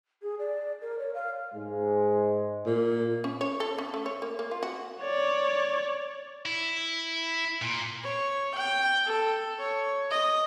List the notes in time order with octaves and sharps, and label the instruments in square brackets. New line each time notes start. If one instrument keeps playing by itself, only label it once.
[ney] G#4
D5
A#4
C#5
F5
[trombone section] G#2 G#3
[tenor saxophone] A#2
[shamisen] C#4
C#5
A4
C#4
A3
C#5
A#3
A#3
F4
F#4
[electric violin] C#5 D5
[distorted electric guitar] E4
A#2
[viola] C#5
G5
A4
C#5
D#5